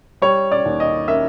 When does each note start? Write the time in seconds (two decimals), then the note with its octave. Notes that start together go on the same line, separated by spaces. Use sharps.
0.22 G3 C#5
0.52 D5
0.66 D#2
0.80 D#5
1.08 A#3 E5